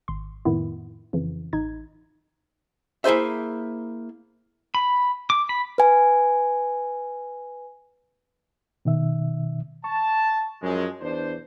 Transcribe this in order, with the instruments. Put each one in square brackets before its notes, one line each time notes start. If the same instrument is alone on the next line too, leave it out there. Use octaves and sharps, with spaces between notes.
[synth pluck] G#1 C6
F2 A2 D#3 B3 E4
F2 C#3 E3
A1 D#4 G#6
[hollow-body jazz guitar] A#3 E4 G#4 C5 E5
[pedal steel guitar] B5
D6
B5
[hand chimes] B4 G#5
[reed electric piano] B2 D#3 E5
[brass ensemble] A5 [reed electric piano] C#6
[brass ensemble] F#2 F3 G#3
E2 D4 C5